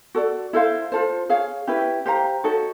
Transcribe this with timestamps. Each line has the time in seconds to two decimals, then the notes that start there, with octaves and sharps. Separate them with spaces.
0.15 F#4 A4 D5
0.53 E4 A4 C5 F5
0.92 F4 A4 C5
1.29 G#4 C#5 F5
1.67 C#4 E4 G4 B4
2.06 G4 C5 F5 A#5
2.44 D#4 F#4 A4 C#5